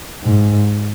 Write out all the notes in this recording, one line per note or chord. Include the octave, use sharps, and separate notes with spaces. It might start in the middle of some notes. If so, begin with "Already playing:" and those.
G#2